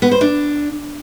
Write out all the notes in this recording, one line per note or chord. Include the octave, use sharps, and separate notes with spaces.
B3
C5
D4